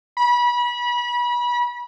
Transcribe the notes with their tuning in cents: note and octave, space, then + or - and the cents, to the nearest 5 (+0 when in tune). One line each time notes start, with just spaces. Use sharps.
B5 -30